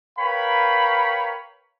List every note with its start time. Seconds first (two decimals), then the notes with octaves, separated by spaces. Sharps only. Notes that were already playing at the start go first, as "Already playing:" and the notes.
0.18 A#4 B4 C#5 F5 G5 B5